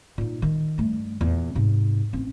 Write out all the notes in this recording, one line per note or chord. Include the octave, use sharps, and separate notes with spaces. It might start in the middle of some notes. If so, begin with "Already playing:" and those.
A#2 D#4
D#3
G2 A3
E2 A#2
G#2 C3
A1 C4